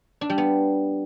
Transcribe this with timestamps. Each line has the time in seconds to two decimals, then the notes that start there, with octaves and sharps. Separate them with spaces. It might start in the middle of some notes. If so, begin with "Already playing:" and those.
0.21 D4
0.30 G3
0.38 B3